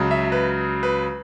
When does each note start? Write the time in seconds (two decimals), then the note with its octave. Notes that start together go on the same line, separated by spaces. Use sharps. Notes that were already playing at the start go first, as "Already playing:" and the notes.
Already playing: C#2 C#3 F#3
0.11 E5
0.32 B4
0.83 B4